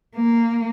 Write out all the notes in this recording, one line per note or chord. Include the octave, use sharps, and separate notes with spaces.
A#3